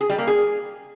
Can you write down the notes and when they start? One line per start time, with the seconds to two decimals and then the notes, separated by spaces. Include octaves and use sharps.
0.01 G#4
0.09 G3
0.18 A#3
0.27 G#4